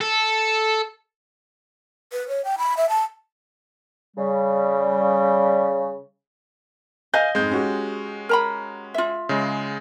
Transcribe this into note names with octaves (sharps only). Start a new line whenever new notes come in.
A4
B4
C#5
G5
B5
E5
A5
C#3 G3
D#5 F5 G#5 G6
F2 G#2 G#3 G6
C#4 F#4 G4
A#4 A#5 B5
F4 E5
C#3 G#3